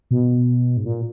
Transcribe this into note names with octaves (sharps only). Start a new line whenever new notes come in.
B2
G#2
A#2